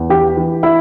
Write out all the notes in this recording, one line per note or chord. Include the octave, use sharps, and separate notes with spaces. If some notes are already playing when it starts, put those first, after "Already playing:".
Already playing: E2
E3 G4
E3
E4